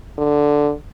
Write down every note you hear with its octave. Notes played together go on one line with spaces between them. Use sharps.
D3